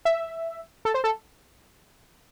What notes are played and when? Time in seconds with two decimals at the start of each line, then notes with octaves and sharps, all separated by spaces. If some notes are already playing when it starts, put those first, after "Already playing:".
0.05 E5
0.85 A4
0.94 C5
1.04 A4